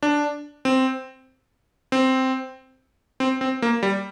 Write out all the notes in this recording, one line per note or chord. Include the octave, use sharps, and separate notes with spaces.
D4
C4
C4
C4
C4
A#3
G3